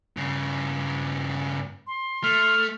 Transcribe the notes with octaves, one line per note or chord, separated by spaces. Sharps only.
G2 C#3
C6
A3 F6